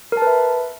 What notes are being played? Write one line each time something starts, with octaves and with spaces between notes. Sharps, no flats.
A#4 B4 E5 A5